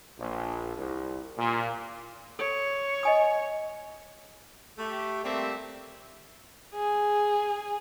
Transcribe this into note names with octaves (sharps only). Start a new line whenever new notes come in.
A#1
C2
A#2
A4 C#5
D#5 G#5 D#6
A3 G4
G3 A3 A#3 C4 C5 E5
G#4